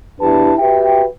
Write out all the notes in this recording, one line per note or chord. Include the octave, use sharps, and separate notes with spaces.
E2 D4 E4 G4 B4 A5
F#4 G4 B4 E5 G5